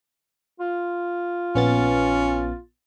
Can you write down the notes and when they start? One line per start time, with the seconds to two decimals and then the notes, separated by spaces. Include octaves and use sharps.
0.60 F4
1.55 A#1 B3 C#4 A6